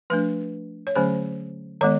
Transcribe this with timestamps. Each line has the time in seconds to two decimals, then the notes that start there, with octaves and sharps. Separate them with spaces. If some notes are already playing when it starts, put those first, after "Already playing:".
0.10 F3 A3 D4 B4
0.87 C#5
0.96 D3 F#3 A3 C#4 C5
1.81 D#3 G#3 B3 C#5